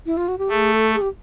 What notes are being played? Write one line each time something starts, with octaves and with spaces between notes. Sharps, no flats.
E4
F4
F#4
G4
A3 G#4
A4
G#4
G4